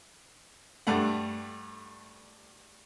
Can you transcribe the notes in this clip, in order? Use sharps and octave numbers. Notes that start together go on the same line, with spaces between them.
G2 A3 F#5